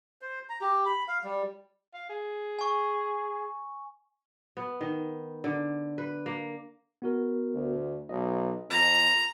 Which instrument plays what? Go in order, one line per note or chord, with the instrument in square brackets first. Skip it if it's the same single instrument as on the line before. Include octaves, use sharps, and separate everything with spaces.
[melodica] C5
A#5
G4
B5
F5
G3
[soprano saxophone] F5
G#4
[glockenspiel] G#5 C#6
[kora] B3
D#3
D3
B4
A#3
[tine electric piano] B3 F#4 A#4
[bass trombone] D2
[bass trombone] B1 [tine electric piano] D#5
[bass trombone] F2 [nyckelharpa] A#5